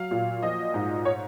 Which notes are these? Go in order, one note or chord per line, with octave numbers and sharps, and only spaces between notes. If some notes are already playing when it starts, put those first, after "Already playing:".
Already playing: F#3 F5
A#2
F3 D#5
G#2
C#5